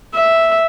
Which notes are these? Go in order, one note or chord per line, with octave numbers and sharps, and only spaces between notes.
E5